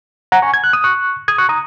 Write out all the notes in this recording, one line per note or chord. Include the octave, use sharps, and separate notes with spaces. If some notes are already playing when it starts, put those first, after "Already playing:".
F#5 A#5
G#5 C#6
G#6
F#6
D#6
C#6 F#6
D#6 G#6
C#6 F#6
A#5 D#6